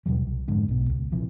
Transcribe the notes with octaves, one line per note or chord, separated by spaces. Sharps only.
D#2 B2 F#3 G3
C2
F2 G#2 D3
B1 B2
C#2
A#1 C3 E3 F3